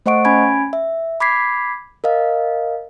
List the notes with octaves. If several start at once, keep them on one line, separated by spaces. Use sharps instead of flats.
A3 C5 D#5 F#5 C#6 D7
C#4 G#5 B5 G#6 D7
E5
B5 D6 G#6 B6 C7
A#4 D#5 F5